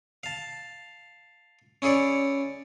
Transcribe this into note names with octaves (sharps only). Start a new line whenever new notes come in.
F5 A5
C#4 E4 G#4 C#5 D5